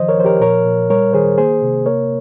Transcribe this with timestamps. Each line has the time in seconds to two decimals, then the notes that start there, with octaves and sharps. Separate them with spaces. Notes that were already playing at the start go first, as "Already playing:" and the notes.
Already playing: D#3 F3 C5 D#5
0.09 A#4 C#5
0.17 F3 C5
0.25 G4 A#4
0.41 A#2 A#4 C#5
0.66 A#2
0.90 G3 A#4 C#5
1.13 D#3 G#4 C5
1.38 A#3 G#4 C5
1.62 C3
1.86 A#3 A#4 C#5